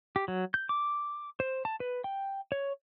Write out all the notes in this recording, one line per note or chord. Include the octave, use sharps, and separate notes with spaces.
G4
F#3
G6
D6
C5
A5
B4
G5
C#5